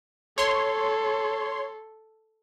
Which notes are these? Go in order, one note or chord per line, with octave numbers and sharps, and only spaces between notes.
A4 C#5 C6